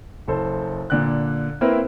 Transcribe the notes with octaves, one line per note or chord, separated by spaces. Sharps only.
F#1 A4 C5
A#2 D3 F#6
A#3 C4 E4 A#4 B4